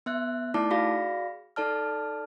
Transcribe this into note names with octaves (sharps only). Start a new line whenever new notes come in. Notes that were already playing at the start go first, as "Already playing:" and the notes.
B3 E5 F#6
A3 D#4 E4 D5 A5 D6
F#4 G#4 D5 F5 B5 A#6
D#4 A4 D5 A5 F6